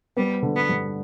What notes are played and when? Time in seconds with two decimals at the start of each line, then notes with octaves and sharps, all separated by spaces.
0.17 G3 B3
0.43 D3
0.56 B3
0.69 G2